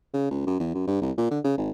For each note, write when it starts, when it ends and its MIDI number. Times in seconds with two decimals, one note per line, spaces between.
0.14 0.29 49
0.31 0.46 37
0.47 0.58 42
0.60 0.73 40
0.74 0.87 42
0.87 1.00 43
1.01 1.11 36
1.17 1.26 46
1.31 1.39 50
1.44 1.56 49
1.58 1.70 32